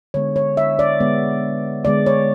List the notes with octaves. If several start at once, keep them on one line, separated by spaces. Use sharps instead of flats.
D3 G#3 B3 C#5
C#5
E5
D5
D3 G#3 B3
D3 G#3 B3 D5
C#5